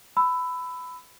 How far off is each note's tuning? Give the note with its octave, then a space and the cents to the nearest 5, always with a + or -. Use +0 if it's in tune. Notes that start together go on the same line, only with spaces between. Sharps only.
B5 +15 E6 +0